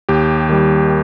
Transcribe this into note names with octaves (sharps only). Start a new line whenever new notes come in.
D#2 G4
D#3 G3